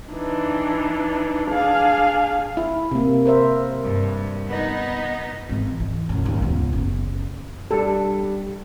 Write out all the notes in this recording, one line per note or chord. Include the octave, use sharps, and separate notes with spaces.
E3 D4 D#4
D4 G#4 F5
E4
C3 A#3
A#4 C5 E5
G2
B3 D#4
G#1 E3
E3
F#2 A#2
D#2 G#2
C#2 B3
F#1
G3 D4 A4